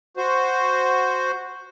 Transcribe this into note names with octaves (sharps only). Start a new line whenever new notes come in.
F#4 C5